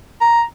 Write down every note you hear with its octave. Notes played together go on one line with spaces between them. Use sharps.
A#5